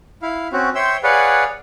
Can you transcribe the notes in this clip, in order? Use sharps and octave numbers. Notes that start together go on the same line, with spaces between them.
E4 F5
C4 C#4 F#4
C5 C#5 E5 G5 C6 E6
G#4 B4 C#5 D5 F5 F#5